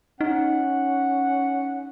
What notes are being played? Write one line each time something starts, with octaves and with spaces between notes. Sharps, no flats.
C#4 D#4 F#5